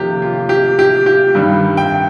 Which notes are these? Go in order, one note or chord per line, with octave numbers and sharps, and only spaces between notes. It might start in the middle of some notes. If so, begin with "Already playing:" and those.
Already playing: F2 C3 D#3 A#3 C#4 F4 G4
F4
G4
G4
G4
G2 D#3 G3
G5